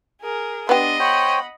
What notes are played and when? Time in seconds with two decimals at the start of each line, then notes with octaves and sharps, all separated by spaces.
0.21 G#4 A#4
0.69 B3 D4 G4 D#5 C6
1.00 C5 C#5 F#5 G5 B5